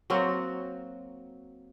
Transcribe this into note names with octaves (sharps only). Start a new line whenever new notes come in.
F#3 A#3 C4 F#4